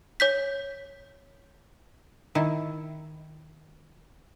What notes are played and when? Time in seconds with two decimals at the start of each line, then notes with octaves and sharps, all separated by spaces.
0.20 C#5 G6 B6
2.35 D#3 E4